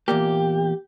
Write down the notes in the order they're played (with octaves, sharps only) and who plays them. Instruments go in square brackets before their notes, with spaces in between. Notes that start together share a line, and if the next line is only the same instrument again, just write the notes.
[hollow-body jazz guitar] E2 A#2 A#3 [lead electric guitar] G4